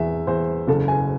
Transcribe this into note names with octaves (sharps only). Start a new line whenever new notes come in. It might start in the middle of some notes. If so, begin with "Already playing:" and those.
Already playing: E2 E5
E2 C5
F#1 A4
G#5